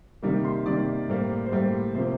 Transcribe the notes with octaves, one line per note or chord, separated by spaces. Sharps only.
C3 D#3 G3 A#3
C6
C3 D#3 G3 A#3 D5
A2 G3 A#3 C5
C5
A2 G3 A#3 D5
C3 F3 A#3 C5